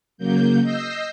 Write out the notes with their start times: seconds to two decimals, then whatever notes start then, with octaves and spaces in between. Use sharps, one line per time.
0.17 C#3 F#3 A#3 G6
0.62 D#5 E6 G6 A#6 C7